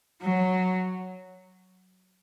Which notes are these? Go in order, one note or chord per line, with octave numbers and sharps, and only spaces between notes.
F#3